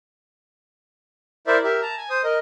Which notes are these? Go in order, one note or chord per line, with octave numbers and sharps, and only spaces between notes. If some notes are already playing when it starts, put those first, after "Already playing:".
E4 A#4 C5 D5 E5
G4 A#4 E5
A5 A#5
G#5
C5 D#6
A#4 D#5